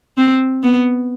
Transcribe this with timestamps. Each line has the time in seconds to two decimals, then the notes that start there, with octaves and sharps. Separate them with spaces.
0.17 C4
0.63 B3